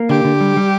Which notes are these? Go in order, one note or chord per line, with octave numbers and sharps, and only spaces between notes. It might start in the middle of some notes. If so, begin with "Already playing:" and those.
Already playing: A#3
D3 G4
D3
G3
G3